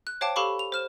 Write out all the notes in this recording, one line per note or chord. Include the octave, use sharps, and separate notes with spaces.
F#6
C5 C#5 F5 G5 A5 D6
G4 A4 F5 B5 C#6 D6
F7
C5 F6 E7